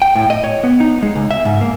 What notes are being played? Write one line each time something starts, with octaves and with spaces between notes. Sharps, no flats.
G5
A2
D#5
C#5
B3
D#4
G#3
C#2
E5
G#2
A#3